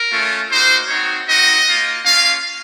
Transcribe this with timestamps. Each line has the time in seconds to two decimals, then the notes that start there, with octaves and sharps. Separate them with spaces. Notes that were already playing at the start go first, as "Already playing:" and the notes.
Already playing: A#4
0.10 A3 C#4 F4
0.49 A#3 D#4 F#4 C5
0.88 C4 D#4 F#4 C#5
1.27 C4 D#4 F#4 D#5
1.66 A#3 F4
2.04 A#3 C#4 F4 F5